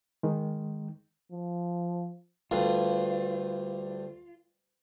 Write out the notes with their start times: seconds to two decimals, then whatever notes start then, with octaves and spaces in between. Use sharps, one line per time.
0.23 D#3 G#3
1.32 F3
2.51 D2 G2 F4